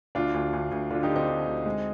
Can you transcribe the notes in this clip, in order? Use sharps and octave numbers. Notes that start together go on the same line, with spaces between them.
D2 D4 F4
D2
D2
D2
D3 D4 F4
D#4 G4
D3
C4 D#4
D3
D2
G#3